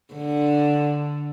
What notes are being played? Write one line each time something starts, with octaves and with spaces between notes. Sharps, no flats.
D3